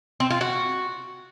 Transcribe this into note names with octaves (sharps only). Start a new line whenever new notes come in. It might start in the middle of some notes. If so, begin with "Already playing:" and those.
C4
F4
F#4